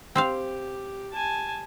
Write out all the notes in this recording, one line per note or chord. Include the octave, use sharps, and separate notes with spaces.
C4 G4 C5 F5
G#5 A5